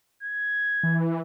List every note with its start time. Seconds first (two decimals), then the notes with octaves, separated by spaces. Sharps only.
0.23 G#6
0.83 E3